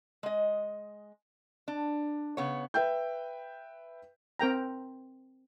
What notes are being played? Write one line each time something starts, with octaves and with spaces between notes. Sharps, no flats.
G#3 D#5
D4
C#3 B3 C#5
B4 E5 G5 G6
C4 A#4 G5 A#5